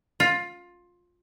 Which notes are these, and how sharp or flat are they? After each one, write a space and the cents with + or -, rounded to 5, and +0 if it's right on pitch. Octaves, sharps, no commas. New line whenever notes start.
F4 +15